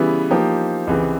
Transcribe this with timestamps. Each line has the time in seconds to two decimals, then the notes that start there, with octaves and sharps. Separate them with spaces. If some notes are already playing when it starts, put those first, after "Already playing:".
Already playing: C#3 E3 G3 B3 E4
0.31 F3 A#3 D#4 G4
0.87 C#2 C3 E3